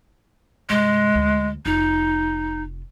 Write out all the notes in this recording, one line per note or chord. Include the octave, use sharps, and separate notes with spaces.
G2 C3 G#3
D2
F1 D#4 F4